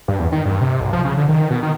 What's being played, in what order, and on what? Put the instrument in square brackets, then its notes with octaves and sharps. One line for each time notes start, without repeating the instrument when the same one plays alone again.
[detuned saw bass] G2
E2
D#3
G2
C3
B1
F3
C#3
D3
D#3
B2
D#3